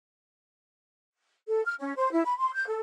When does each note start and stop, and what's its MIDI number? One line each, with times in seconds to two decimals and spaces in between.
1.48 1.63 69
1.65 1.74 89
1.79 1.93 61
1.95 2.09 72
2.12 2.22 64
2.25 2.36 83
2.37 2.54 84
2.54 2.67 91
2.68 2.80 69